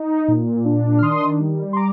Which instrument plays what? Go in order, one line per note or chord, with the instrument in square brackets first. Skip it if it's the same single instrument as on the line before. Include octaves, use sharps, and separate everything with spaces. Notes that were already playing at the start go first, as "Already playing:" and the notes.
Already playing: [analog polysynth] D#4
A#2
D4
F6
D#3 C6 D#6
G3
C6
A#5 D6